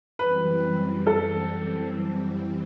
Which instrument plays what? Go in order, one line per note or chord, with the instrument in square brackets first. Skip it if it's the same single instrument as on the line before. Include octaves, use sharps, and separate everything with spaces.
[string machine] F#2 E3 G3 C4 [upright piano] B4
[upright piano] A4